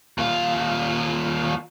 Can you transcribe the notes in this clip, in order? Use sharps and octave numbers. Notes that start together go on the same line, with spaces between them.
D#2 F4